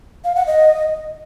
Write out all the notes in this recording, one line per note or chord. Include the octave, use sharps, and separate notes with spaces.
F5
F#5
D#5